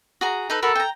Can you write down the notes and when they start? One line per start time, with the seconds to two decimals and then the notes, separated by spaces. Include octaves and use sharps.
0.21 F#4 G#4 A#5
0.50 D#4 A4 B4
0.62 F#4 A4 A#4 B5
0.75 G5 A#5